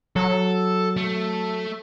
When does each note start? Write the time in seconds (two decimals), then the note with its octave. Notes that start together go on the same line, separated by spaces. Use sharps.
0.16 F#3 A4
0.97 A3